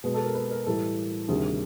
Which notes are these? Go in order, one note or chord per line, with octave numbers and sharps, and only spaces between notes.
B2 G#3 B3 G#4
A4
A#4
B4
A#4
A2 E3 G3 A4
D2 C3 D#3 G3 G#4